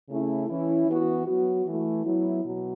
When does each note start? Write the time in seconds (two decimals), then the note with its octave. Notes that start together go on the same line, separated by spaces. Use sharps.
0.09 C#3 A3 C#4 E4
0.48 E3 C#4 E4
0.87 E3 B3 F#4
1.26 F#3 B3 F#4
1.66 E3 A3 E4
2.05 F#3 B3 E4
2.44 B2 F#3